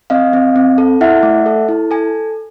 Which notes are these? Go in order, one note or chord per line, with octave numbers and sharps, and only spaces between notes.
C4 D#5 F5
C4
C4
A4
E4 E5 F#5
A3
A4
E4
A4 G#5